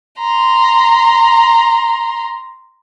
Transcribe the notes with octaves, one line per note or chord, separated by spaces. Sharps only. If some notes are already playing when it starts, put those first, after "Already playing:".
A#5 C6